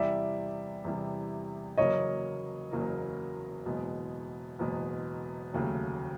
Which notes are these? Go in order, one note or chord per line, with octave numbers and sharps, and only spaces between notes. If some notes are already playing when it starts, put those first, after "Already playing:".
Already playing: E2 C3 E3 G3 D5 E5
E2 C3 E3 G3
F#1 E2 C#3 F#3 A#3 C#5 D#5
F#1 E2 C#3 F#3 A#3
F#1 E2 B2 G#3
F#1 E2 B2 G#3
F1 D#2 C#3 F#3 A3